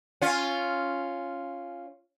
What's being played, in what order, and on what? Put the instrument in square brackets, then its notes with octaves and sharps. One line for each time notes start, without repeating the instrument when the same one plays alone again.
[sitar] C#4 F4